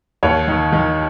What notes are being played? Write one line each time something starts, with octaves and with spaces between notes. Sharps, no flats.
D#2 C#5
D#3
D#3